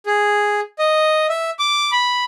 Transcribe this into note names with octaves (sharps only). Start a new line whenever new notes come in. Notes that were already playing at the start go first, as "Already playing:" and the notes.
G#4
D#5
E5
D6
B5